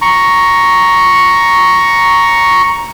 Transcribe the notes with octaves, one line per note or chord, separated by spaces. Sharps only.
A#5 C#6